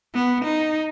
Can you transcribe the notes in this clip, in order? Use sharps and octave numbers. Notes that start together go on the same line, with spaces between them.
B3
D#4